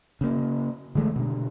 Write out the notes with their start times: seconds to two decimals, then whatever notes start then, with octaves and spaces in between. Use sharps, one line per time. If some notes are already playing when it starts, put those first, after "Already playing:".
0.21 C#3 A#3
0.95 D3 E3 G#3 A3
1.16 B2 D3